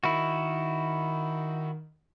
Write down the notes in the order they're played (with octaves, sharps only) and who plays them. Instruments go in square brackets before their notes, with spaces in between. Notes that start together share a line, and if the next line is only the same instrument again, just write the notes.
[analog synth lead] D#3 [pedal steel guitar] E4 F#4